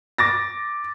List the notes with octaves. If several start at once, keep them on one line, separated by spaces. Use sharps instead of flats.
D6 A6 A#6